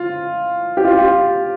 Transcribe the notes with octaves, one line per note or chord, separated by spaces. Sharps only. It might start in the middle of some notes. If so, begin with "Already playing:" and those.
Already playing: F4
G4
F4
G4